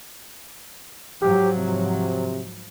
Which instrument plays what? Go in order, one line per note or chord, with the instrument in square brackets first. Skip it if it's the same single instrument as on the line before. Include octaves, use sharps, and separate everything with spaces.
[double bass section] G#2 F3 F#3 [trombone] G4
[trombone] C3